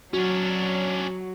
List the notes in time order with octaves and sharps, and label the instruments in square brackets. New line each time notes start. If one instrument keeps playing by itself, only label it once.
[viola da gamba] F#3 [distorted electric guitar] C#4 D4 [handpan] F#4